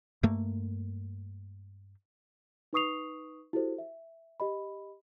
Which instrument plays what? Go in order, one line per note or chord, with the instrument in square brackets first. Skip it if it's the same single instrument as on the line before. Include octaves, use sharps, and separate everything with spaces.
[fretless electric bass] G2 A3 A#3
[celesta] D#4 B4 C#6 D#6 C7 F7
E4 F#4 G4 A4 C5
E5
G4 D#5 B5